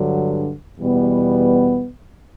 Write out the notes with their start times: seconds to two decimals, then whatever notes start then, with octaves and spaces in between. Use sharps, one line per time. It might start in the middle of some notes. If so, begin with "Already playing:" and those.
Already playing: G2 D3 F#3
0.79 E2 B2 G3 B3